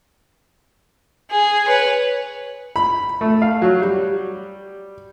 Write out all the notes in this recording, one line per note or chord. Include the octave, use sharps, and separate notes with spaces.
G#4
B4 C#5
B5
A3
F5
F#3
G3